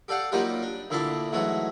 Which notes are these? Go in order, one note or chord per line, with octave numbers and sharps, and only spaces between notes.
G4 A4 D5 F5 F#5
F#3 G3 A#3 D#4 F4 G4
D4
D2 A#2 E4 F5 A5 D6
G#2 E3 F#3 A3 C#5